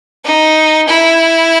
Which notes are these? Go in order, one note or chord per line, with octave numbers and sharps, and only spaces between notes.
D#4
E4